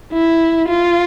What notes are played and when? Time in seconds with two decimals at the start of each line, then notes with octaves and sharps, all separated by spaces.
0.13 E4
0.68 F4